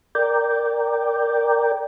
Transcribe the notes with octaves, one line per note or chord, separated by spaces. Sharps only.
A#4 D5 G5